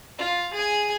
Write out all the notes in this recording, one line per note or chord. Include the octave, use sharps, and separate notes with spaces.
F4
G#4 G#5